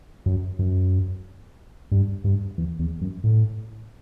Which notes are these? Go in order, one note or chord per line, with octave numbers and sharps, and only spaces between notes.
F#2
F#2
G2
G2
E2
E2
F#2
A2